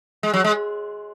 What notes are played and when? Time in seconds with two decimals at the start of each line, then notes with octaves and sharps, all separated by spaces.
0.23 G#3
0.34 F#3
0.44 G#3